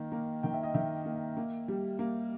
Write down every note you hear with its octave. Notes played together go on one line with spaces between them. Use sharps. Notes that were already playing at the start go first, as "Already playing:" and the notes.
Already playing: D#3 A#3
A#3
D#3 G5
E5
D#5
D#3 E5
A#3
A#3
G3
A#3